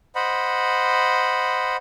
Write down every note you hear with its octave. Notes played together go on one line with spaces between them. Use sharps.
C5 D#5 F#5 B5